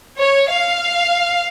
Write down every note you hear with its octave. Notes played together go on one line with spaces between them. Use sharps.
C#5
F5